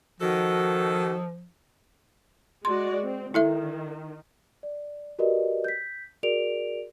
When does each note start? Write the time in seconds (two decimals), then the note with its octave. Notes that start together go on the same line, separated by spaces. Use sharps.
0.21 D#3 F3 F#4 A4
2.65 G#3 F#4 D5 C6
3.04 C4
3.34 D#3 E4 A4 E5
4.63 D5
5.19 F#4 G4 A#4 B4 D5 D#5
5.64 G6 B6
6.23 F#4 G#4 A#4 D5 D7 F7